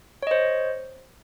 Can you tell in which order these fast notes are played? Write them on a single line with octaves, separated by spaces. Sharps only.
C#5 D#5 C5